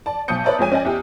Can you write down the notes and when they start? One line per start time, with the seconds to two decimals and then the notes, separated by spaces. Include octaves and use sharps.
0.06 D5 A5
0.28 B1 A5 D#6 G6 C#7
0.44 B4 C#5 D5 E5 A5 A#5
0.59 F2 G#3 C#5 G#5 D#7
0.72 C#4 D5 D#5 G#5
0.85 E2 E4 G4